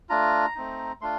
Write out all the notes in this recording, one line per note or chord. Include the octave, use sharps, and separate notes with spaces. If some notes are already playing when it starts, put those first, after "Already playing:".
A3 D4 F4 A#5
A3 C4 D#4
A3 D4 F4 C6